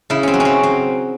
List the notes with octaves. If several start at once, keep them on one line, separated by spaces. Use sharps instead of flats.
C#3 E4
C4 C#4
F#3
C#4
C4
C4